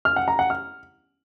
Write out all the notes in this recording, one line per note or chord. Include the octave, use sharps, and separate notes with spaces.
F6
F#5
A#5
F#5
F6